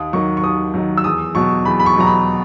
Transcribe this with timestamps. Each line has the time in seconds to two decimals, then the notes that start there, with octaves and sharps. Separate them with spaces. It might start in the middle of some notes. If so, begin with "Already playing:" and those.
Already playing: D#2 D#6
0.13 D#3 F#3 C#6
0.37 C#6
0.44 D#2 D#6
0.74 D#3 F#3
0.97 E6
1.04 E2 D#6
1.35 B2 F#3 C#6
1.65 E2 B5
1.80 B5
1.86 C#6
1.96 B2 F#3 A#5
2.07 B5